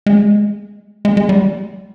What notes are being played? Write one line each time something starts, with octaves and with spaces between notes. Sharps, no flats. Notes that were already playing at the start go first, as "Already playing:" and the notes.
G#3
G#3
G#3
G3